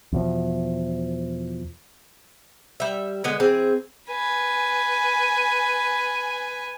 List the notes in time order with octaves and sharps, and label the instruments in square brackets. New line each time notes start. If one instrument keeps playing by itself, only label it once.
[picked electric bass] E2 B2 F3
[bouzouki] G3 E5
D3 G#3 B3
E3 C4 G#4
[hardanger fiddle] B4 G#5